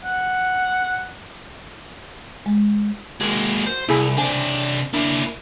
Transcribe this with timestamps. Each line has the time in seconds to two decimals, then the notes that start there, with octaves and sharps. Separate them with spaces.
0.04 F#5
2.46 G#3
3.20 G#3 A#3 F#4
3.66 C5
3.88 C2 E4 G#4 G#5
4.17 C3 D4 C5 G#5
4.93 A#3 D4 E4